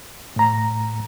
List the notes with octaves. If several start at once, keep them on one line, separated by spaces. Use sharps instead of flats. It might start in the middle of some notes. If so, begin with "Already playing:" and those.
A2 A#5